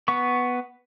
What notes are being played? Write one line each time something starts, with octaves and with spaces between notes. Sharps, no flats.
B3 C#6